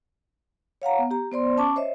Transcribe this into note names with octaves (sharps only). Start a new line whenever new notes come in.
C#5 F5 F#5 A#5
B3
G4 A#5
B3 C5 D5 C6
C#4 A5 C#6 D6
C5 C#5 D#5 E5